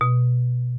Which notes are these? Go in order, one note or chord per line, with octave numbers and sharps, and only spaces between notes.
B2